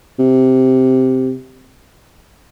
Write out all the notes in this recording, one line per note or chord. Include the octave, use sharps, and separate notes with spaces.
C3